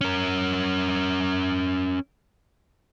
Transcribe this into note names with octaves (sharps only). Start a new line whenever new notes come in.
C#4 A#4